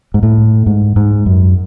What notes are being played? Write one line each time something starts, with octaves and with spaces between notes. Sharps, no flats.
G#2
A2
G#2
G#2
F#2